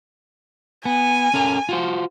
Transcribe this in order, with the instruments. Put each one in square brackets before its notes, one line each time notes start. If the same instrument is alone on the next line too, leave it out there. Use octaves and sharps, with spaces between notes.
[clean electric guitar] B3 [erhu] G#5
[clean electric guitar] C#4 A4 A#4
F4 F#4 C5